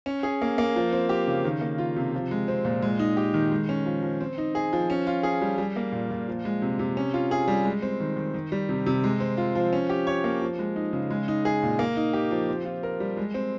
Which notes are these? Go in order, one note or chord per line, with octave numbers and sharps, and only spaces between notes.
C#4
G#4
A#3
A#3
F3
C4
G4
C#3
D#3
A#3
F4
C3
F3
G#3
C4
A#2
G#3
D#4
G4
D#3
G#3
C#4
F3
F3
C4
D#4
G#4
F3
C#4
F4
G#4
G3
G3
A#3
A#2
A#2
F3
G#3
C3
C3
C#4
F4
G#4
G3
G#3
C4
D#3
D#3
D#3
G3
C3
C3
G#3
C4
F4
F3
C#4
G4
C#5
A#3
F3
G#3
D#4
C#3
G#3
D#4
G#4
A#2
A#3
D#4
G4
F3
C4
F4
A#4
G3
G#3
C4